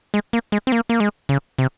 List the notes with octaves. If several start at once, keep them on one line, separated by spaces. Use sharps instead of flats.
G#3
A#3
G#3
C4
A#3
A#3
G#3
C#3
C3